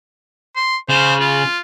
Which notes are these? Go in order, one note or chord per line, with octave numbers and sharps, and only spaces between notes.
C6
C#3 C5
F4